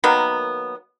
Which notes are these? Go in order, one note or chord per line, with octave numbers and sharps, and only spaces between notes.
D#3 F#3 A#3 B3